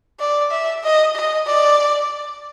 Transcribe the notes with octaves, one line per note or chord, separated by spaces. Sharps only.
D5
E5
D#5
D#5
D5